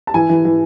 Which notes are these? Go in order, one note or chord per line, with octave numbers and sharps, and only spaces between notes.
A5
E3 G#5
E3
E3